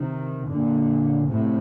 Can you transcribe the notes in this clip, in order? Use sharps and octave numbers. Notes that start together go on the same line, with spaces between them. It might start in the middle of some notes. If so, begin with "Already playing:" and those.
Already playing: C3 D#3
A#2 D3
A2 C3